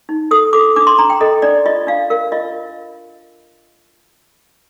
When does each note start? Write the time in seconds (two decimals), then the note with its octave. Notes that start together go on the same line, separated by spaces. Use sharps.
0.09 D#4
0.31 A4 D#6
0.53 A4 D6
0.76 D4 D6
0.87 C6
0.98 D4 A#5
1.10 G5
1.21 A4 D#5
1.42 D4 D5
1.66 F4 D#5
1.87 D4 F5
2.10 A#4 F5
2.32 F4 D#5